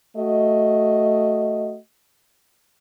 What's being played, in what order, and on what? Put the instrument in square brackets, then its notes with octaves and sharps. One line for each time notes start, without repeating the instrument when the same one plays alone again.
[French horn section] A3 F#4 D#5